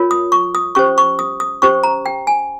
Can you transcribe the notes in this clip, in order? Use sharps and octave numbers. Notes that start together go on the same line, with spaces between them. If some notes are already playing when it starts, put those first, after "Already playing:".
Already playing: F4 A#4 C#5
D#6
C#6
D#6
C#4 G4 C5 C#6
C#6
D#6
D#6
C#4 G4 C5 C#6
A#5
G5
G#5